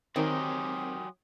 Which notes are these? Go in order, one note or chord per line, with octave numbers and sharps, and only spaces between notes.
D#3 F#3 C4 G4 A#4 G#5 C6 D#6